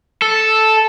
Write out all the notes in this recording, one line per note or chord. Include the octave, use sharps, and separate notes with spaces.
A4